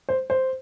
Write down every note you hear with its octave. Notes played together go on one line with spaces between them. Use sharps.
C5
C5